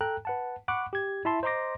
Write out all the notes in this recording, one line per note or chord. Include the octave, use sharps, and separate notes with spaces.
A4 G5 A#5 F#6
B4 F#5 A5
F#5 B5 C#6 D6 F#6
G4 G#6
E4 E5 A5 C6
C5 D#5 A#5 C6 D6 A#6